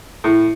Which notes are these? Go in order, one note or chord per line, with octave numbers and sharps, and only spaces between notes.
A2